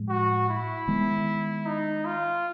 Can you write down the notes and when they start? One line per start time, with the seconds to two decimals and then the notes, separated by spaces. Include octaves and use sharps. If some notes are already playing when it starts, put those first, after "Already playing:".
Already playing: A2 F3 G#3
0.09 F#4
0.49 E4
0.88 D#3 G#3 B3
1.66 D#4
2.05 F4